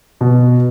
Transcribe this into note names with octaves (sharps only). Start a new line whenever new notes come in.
B2